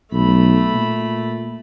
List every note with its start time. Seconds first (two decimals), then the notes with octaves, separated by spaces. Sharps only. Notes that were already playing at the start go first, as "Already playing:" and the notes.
0.12 B1 A3 B5
0.75 A#2